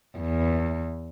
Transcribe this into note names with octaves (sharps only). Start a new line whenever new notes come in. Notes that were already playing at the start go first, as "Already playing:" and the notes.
E2